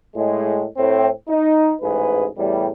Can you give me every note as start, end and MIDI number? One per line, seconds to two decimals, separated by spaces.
0.16 0.64 45
0.16 0.64 56
0.77 1.09 45
0.77 1.09 60
1.28 1.72 63
1.82 2.27 33
1.82 2.27 44
1.82 2.27 68
1.82 2.27 71
2.37 2.68 40
2.37 2.68 45
2.37 2.68 55